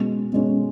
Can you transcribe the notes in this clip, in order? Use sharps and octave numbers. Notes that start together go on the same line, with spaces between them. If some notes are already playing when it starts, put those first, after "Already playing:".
Already playing: B2 G#3 C#4
B2 G#3 C#4